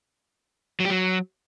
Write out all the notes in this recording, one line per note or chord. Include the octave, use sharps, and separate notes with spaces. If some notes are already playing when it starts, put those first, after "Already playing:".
F#3
G4
F#3